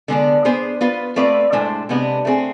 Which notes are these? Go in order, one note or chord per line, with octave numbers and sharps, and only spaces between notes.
D3 G#3 B3 D4
B3 D4 G#4 C5
B3 F4 B4
A3 C4 F4 B4 D5
A2 G#3 D4 A4 C5
C3 G#3 B3 D4
A3 C4 G#4